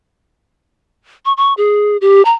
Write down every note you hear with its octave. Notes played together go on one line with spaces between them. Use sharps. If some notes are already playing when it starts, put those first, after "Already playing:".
C#6
C#6
G#4
G4
A#5